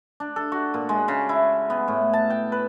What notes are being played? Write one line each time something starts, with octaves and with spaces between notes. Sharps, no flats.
D4
A4
F#4
A#2
G#3
C#3
E4
B3
A2
A5
G5
B4